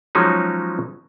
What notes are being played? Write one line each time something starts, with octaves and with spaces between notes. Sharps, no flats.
F3 F#3 G#3 C#4 D#4